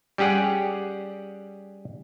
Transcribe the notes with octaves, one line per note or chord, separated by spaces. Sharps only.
G3 C#4 G4 G#4 F#5